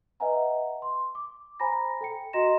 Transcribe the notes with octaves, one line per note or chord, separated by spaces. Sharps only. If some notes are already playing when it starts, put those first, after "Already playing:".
B4 D#5 E5 F#5 G#5 A#5
C6
D6
C5 G#5 A#5 B5 A#6
A4 G5 C#7
F#4 D#5 A#5 C6 A#6 E7